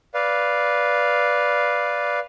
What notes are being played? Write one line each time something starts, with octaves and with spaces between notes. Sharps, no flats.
B4 D5 F5